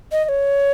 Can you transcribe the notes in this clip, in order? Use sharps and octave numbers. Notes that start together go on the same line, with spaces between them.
D#5
D#5
C#5